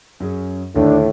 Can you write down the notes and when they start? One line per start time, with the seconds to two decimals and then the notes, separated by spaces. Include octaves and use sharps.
0.20 F#2 C#4 G#4
0.75 D#2 A2 D3 A3 D4